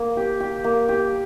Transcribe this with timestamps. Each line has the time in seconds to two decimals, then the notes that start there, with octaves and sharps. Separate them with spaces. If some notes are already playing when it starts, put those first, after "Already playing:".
Already playing: A#3
0.17 G4
0.40 G4
0.64 A#3
0.89 G4